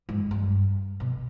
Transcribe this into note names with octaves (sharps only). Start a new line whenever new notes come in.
G#2
G2
B2